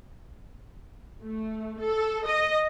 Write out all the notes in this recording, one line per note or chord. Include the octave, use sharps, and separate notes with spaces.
A3
A4
D#5